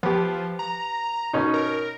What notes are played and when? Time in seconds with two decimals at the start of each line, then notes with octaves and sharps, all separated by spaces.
0.03 F3 B3 G4
0.59 A#5
1.33 B2 C#4 D#4
1.54 A#4